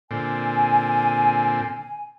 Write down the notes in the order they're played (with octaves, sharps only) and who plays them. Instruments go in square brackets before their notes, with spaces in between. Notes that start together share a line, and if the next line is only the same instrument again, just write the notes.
[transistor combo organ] A#2 D3 C4 [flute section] G#5